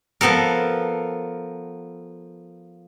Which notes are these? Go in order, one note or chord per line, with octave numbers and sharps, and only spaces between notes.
F3 B3 A4 A#4